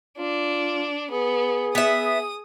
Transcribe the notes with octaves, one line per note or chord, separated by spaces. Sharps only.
D4 F4
B3 G#4
B3 E5 D#6